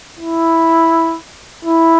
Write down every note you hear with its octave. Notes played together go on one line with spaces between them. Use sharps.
E4
E4